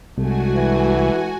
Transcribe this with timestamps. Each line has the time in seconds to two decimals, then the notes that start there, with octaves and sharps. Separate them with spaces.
0.18 C2 G#3 A3 D4 F#4 G#5
0.55 E3